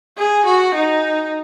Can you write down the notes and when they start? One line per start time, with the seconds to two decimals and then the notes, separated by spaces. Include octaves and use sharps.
0.18 G#4
0.46 F#4
0.75 D#4